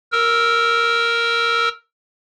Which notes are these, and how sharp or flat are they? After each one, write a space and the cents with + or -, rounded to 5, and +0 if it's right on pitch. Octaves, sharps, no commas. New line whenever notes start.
A#4 +0 E6 +0